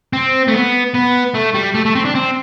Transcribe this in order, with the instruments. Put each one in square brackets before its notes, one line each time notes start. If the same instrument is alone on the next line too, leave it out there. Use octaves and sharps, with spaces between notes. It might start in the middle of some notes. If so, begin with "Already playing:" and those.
[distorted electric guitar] C4
A3
B3
B3
A3
G3
A3
A3
C4
D4
C4